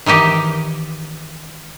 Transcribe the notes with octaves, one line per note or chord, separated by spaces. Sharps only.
D#3 E3 D#4 G4